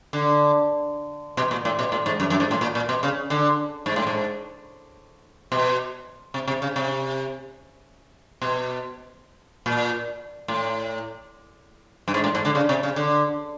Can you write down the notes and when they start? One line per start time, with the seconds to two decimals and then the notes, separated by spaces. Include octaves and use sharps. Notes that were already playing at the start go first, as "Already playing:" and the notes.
0.13 D3
1.37 B2
1.51 A#2
1.65 A2
1.79 B2
1.92 A2
2.06 G#2
2.20 F#2
2.30 F#2
2.40 G#2
2.51 A2
2.61 A#2
2.75 A#2
2.89 B2
3.03 C#3
3.30 D3
3.86 G#2
3.96 A2
4.07 G#2
5.52 B2
6.34 C3
6.48 C3
6.62 C#3
6.76 C3
8.41 B2
9.66 A#2
10.48 A2
12.08 G2
12.14 G#2
12.24 A2
12.35 G#2
12.45 D3
12.55 C#3
12.69 C3
12.83 C#3
12.96 D3